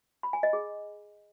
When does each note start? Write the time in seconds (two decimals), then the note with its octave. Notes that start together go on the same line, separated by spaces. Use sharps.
0.23 B5
0.33 G#5
0.43 D#5
0.53 G#4